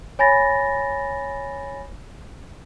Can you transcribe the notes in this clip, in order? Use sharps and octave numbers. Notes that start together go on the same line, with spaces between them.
C#5 G#5 B5 A6 A#6